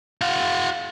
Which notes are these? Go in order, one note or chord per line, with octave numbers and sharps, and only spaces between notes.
F#4 F5